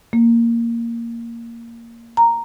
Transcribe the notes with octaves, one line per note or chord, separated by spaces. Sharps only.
A#3
A#5